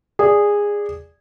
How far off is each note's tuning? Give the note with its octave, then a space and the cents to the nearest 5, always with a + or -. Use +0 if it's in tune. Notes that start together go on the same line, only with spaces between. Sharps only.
G#4 -15 D5 +0